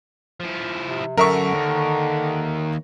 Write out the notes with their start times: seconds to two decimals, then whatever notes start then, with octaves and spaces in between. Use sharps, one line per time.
0.40 F3 E4
0.87 C3
1.17 F#2 D3 A#4 E5 C#6
1.54 D#2